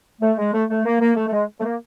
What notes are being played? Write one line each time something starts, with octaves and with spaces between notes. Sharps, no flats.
A3
G#3
A3
A3
A#3
A#3
A3
A3
G#3
A3
A#3